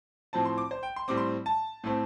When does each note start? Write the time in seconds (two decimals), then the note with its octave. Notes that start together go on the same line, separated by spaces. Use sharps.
0.33 A2 F3 C4 A5
0.45 C6
0.58 D6
0.71 C5
0.83 G5
0.96 C6
1.08 A2 G3 C4 D6
1.17 C6
1.46 A5
1.84 A2 A3 C4